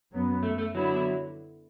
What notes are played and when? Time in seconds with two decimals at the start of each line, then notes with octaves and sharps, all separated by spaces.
0.11 F#2 F#3 B3
0.43 A3
0.58 A3
0.75 D3 F#3 B3 E4